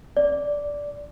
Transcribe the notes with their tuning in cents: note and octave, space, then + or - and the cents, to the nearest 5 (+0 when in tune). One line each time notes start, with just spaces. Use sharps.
D5 -10